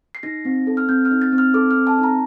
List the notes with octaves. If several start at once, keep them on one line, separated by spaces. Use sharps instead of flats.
C7
D#4 A#6
C4
A4
F6
C4 G6
F6
D#4
A6
C4
F6
A4 D6
F6
C4
A5
D#4
A#5